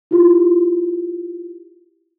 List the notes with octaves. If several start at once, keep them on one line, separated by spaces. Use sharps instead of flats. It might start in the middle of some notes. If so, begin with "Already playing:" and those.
E4 F4 G4